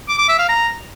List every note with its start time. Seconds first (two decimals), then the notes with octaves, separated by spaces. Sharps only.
0.08 D6
0.19 D6
0.29 E5
0.39 F5
0.49 A#5